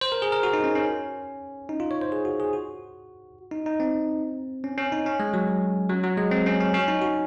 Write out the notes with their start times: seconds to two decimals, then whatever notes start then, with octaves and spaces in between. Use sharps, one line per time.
0.01 C5
0.12 A#4
0.22 G#4
0.32 A#4
0.43 F#4
0.53 D#4
0.64 C#4
0.75 C#4
1.69 D#4
1.80 F4
1.91 C#5
2.01 C5
2.12 G#4
2.25 F#4
2.40 G#4
2.53 F#4
3.51 D#4
3.66 D#4
3.80 C4
4.64 C#4
4.78 C#4
4.92 D#4
5.06 C#4
5.20 G#3
5.34 F#3
5.89 F#3
6.03 F#3
6.17 G#3
6.31 C4
6.46 C#4
6.60 C#4
6.74 C#4
6.88 D#4
7.02 F#4